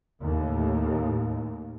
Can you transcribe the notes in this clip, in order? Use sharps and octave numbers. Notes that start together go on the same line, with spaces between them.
D#2 A2